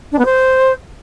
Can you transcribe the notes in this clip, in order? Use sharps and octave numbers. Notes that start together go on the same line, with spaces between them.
D4
B3
C5